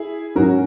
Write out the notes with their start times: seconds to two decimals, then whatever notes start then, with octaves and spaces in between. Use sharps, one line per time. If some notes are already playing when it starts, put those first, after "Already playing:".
Already playing: E4 G#4
0.35 G#2 F#3 C#4 F#4 A#4